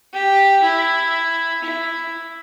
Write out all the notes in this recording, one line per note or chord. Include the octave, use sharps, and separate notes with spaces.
G4
E4
E4